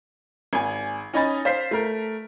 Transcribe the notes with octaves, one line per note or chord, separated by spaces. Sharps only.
G#1 G#5
C#4 D#4 D#5 G#5 B5 A6
C5 F5 B6 C7
A3 A#4